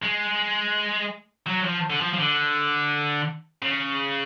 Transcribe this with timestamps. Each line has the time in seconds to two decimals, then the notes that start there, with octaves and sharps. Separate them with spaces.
0.02 G#3
1.47 F#3
1.65 F3
1.90 D3
2.01 F3
2.13 F3
2.19 D3
3.63 C#3